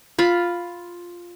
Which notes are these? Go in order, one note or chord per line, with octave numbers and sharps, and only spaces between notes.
F4 B5